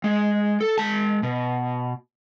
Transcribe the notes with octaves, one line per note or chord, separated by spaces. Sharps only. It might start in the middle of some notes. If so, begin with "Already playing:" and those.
G#3
A4
G#3 A5
B2